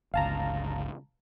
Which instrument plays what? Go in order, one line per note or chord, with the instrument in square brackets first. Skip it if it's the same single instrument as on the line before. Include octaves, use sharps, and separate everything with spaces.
[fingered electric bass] G1 C#2 [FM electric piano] F5 A5 A#5